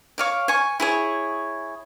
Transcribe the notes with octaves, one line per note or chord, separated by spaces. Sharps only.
C#5 F5 D6
G#5 C#6
E4 G#4 C#5